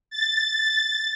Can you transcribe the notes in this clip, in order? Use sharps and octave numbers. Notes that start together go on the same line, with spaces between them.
A6